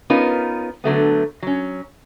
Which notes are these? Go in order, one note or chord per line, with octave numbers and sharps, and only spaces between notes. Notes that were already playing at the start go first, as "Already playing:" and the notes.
B3 C#4 D#4 F4 A#4 B4
D3 F#3 A3 B3
F#3 C#4